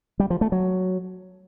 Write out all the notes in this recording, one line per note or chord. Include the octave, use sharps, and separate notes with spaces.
G3
F3
A3
F#3